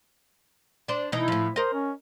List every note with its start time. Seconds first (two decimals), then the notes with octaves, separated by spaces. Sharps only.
0.88 D4 C5
1.12 B2 E3 D#4 E4
1.28 A2 F3
1.56 A#4 C5 D#5
1.74 C#4